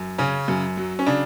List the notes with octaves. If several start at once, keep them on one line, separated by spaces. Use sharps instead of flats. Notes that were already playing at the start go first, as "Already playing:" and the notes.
Already playing: F#2
C#3 C#4
F#2
F#3
C#4
C#3 D4